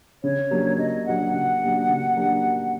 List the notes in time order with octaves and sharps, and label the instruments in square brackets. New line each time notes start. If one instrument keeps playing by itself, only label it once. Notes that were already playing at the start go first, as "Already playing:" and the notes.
[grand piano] C#3 [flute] C#5
[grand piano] F#3 A#3 D4 G4
[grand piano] C#3 [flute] D#5
[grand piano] F#3 A#3 D4 G4 [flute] F#5
[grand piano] C#3 [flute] F#5
[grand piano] F#3 A#3 D4 G4
C#3
F#3 A#3 D4 G4